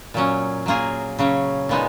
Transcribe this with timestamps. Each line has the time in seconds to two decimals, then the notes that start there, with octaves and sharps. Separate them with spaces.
0.14 A#2 F#3 C#4
0.66 F#3 A#3 F4 G#4
1.19 C#3 F#3 C#4
1.69 A#2 G#3 B3 D#4